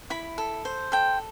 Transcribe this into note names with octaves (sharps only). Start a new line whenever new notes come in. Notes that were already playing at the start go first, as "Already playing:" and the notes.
E4 B5
A4
C5
A4 G5